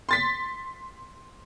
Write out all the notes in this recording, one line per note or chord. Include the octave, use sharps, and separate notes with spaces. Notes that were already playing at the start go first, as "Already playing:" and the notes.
C6 A6 B6